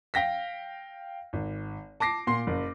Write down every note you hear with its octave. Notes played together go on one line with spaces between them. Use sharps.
F5 G5 A#6 B6
G#1
A5 D6 A#6 C7
A#2 C6 C7
F#1